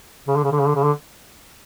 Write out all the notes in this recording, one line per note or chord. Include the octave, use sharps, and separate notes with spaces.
C#3
D3
C#3
D3
C#3
D3
C#3
D3